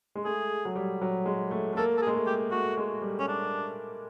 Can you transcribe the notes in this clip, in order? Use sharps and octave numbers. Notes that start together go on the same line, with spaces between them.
G#3
A3 G#4
F#3
G3
F#3
G#3
A3
A3
A#3 A4
A4
G#4
G#3
A3
G4
A3 F#4
G#3
G3
C#4
D4